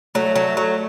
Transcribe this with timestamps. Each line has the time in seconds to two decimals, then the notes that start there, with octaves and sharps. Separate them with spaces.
0.15 F#3 A3
0.35 F#3
0.57 F#3